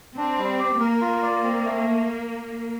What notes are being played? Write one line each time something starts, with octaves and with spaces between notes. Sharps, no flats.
C4 D4
G3
G4
A#3 A#4
F4
D5
C4
A3